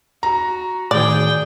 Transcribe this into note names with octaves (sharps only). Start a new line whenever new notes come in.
F#4 A#5
A2 D#3 G#4 D5 G5